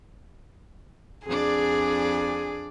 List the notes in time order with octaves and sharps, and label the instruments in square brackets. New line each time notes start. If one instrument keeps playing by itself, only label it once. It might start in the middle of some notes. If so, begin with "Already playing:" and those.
[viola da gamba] F2 D4 D5 [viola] G#4